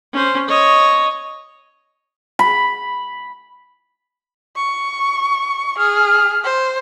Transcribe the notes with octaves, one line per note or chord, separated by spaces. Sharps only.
C#4 C5
C#5 D#5
B5
C#6
G#4 F6
C5